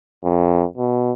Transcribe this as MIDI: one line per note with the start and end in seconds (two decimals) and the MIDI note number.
0.24 0.65 41
0.77 1.12 47